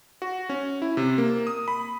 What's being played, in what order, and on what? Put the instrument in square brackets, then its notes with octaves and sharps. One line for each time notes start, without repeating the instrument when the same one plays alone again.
[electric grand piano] F#4
C#4
E4
C3
A#3
D#6
B5